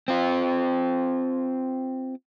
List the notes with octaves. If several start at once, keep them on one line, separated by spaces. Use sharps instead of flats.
C4 F4